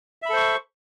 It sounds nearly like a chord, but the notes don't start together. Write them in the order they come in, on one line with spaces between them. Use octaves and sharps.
E5 B5 A4 C5 C#6